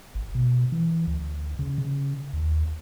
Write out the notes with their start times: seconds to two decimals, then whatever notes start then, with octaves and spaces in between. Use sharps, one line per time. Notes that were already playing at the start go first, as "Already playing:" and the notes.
0.15 G#1
0.35 B2
0.72 E3
1.07 D2
1.59 C#3
1.78 C#3
2.33 D#2